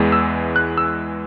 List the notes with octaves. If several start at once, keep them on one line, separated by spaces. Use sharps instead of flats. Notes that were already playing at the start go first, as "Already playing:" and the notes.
Already playing: E2 E3 G#3
E6
F#6
E6